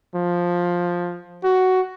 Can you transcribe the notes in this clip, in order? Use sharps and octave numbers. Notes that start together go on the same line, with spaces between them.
F3
F#4